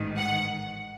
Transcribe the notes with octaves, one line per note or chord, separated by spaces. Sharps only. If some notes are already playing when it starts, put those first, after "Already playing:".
Already playing: A1 G#2 D#3
F#5